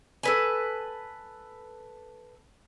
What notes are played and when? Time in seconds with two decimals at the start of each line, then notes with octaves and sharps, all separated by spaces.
0.23 A4 B4 G#5